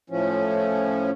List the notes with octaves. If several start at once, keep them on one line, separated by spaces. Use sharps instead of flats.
A2 F3 C#4